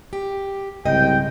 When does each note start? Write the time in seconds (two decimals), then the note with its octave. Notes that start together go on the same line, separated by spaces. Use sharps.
0.13 G4
0.85 C2 G#2 C#3 D#5 G5